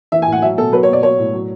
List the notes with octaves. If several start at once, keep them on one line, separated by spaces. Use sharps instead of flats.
E3 E5
G#5
A2
F#5
F#3 E5
B2 A4
F#3 B4
C#5
B2
D5
F#3 C#5
A2
F#3